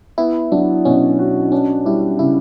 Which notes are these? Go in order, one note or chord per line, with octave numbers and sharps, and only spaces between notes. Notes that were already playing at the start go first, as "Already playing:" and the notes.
B3 E4
F#3 D4
B2 C#4
F#4
C#4 D4
G3 E4
C#3 E4